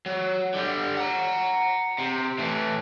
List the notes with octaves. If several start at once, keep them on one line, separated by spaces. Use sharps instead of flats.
F#3
D3 G3
F#5 A#5
C3
A2 E3